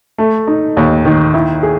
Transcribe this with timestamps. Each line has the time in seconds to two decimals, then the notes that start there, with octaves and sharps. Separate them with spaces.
0.18 A3
0.47 D#4
0.77 D#2
1.05 D#3
1.34 E4
1.63 G#4